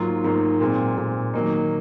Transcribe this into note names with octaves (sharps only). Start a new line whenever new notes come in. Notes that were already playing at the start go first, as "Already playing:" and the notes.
Already playing: G#2 F#3 A#3 F4
G#2 F#3 A#3 F4
A#2 G#3 C4
A#2 G#3 C4
D#3 F#3 A#3 D#4